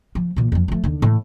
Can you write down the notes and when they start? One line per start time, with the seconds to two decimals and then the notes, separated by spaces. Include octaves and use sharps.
0.15 F3
0.36 A#2 E3
0.52 F2 F3
0.68 F3 A3
0.84 D#2 D3
1.02 A2 E3